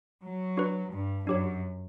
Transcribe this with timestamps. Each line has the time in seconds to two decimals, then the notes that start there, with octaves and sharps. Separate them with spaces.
0.23 F#3
0.57 D4 F#4 B4
0.92 G2
1.26 F#2 D4 G4 C#5